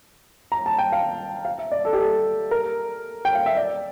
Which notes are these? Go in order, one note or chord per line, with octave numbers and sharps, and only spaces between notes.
A#5
A5
G5
F5
F5
E5
D5
A4
G4
A4
A#4
G5
F5
E5
D5